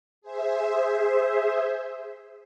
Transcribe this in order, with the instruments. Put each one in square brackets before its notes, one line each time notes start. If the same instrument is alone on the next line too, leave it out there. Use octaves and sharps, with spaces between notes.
[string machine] G#4 C5 E5